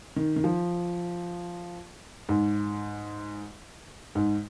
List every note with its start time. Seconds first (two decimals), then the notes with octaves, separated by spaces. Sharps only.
0.16 D#3
0.36 D#3
0.44 F3
2.29 G#2
4.15 G#2